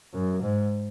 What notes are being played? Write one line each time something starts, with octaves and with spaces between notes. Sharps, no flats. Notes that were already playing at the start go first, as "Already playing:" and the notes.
F#2
G#2